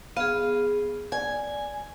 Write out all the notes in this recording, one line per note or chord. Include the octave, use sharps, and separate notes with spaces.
B3 G#4 F5
D5 G#5